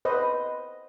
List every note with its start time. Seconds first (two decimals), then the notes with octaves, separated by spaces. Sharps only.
0.05 B4 C5 D#5